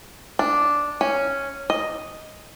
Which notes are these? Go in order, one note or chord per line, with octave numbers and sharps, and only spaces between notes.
D4
C#4
D#5